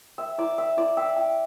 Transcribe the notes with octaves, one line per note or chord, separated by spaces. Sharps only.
E5 G5
E4 D5
E5 G5
E4 D5
E5 G5
G5